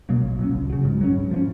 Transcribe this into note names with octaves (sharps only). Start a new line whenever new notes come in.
B2 F#3 A#3
A#1
A#2 F#3 C#4
C#2
C#3 F#3
G#2
F#3 A#3 C#4
G#2
F3 A#3 C#4